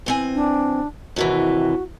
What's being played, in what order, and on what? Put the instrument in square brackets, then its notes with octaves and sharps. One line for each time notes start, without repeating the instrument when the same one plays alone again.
[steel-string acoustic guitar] E3 C4 G#5
[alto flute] D4
[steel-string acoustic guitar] D#2 C3 E3 [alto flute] F#4